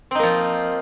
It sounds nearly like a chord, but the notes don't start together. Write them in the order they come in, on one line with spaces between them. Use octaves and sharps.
C4 D#4 A#3 F3